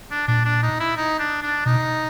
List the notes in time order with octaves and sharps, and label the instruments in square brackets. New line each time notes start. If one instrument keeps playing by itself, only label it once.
[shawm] D4
[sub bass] A#2 [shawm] D4
[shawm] D4
D#4
E4
D#4
D4
D4
[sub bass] B2 [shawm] D#4